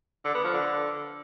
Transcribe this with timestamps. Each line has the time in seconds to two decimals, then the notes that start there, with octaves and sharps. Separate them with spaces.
0.25 D3
0.34 B3
0.44 F3
0.54 D3